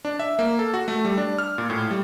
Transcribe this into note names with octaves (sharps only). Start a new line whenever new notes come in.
D4
E5
A#3
A4
F#4
A3
G3
D4
F6
A#2
A2
G3